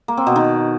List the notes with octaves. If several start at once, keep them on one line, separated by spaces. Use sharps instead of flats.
A#3
C4
B2
D#3